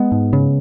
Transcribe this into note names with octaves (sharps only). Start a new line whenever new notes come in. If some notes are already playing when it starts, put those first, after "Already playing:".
Already playing: G#3 B3
G#2
C#3